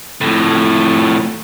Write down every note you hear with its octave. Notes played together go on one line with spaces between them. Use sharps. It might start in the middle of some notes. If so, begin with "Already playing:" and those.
F2 A2